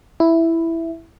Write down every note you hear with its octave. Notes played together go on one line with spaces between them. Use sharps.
E4